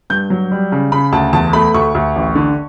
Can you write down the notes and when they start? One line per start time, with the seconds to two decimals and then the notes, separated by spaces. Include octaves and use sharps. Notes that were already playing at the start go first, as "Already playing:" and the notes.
0.10 G2 G6
0.30 F#3
0.51 G3
0.72 C#3
0.92 C#3 B5
1.12 D2 A5
1.33 E2 A5
1.53 A3 B5
1.74 D2 C#6
1.95 D2
2.16 A1
2.35 D3